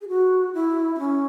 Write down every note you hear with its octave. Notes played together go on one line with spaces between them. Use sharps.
G#4
F#4
E4
E4
C#4